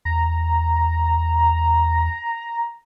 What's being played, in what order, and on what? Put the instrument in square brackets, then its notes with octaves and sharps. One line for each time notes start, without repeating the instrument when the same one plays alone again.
[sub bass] E2 [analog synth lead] A#5